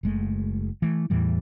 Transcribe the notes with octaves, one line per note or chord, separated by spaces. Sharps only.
F#1 G#3 A3
E3 A3
E2 A2 E3 G3